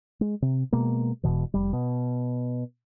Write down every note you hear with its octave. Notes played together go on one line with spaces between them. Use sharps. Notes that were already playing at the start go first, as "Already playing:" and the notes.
G#3
C3
B2 G#3 A#3
E1 B1 B2 E3
F1 G3
B2